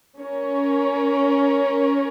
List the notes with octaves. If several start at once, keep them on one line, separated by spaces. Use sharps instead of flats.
C#4 A#4 C#5